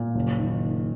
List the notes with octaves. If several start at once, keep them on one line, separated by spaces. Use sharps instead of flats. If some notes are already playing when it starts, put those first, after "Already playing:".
Already playing: A#2
F#1
D#3